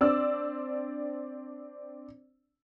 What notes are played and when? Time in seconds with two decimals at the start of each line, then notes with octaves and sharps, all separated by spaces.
0.01 C4 D4 D5 E6